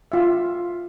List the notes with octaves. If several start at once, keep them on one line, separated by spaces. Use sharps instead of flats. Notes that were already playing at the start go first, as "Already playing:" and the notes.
F4 E5